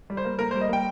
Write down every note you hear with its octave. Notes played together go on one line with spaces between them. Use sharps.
G3
C5
A#3
A#3 A#4
C5
G3
D#5
A#3 G5